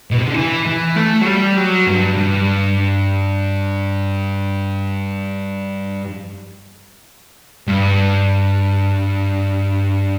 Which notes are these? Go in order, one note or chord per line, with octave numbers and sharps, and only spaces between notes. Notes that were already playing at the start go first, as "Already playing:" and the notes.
B2
C3
D3
E3
E3
A3
F#3
G3
F#3
G2
G2
G2